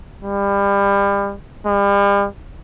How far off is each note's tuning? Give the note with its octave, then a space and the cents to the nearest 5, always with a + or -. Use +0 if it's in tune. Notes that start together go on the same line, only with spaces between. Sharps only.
G3 +30
G3 +40